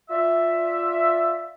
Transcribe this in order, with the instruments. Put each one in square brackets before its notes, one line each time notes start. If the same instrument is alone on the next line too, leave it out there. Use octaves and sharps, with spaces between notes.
[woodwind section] F4 D5 E5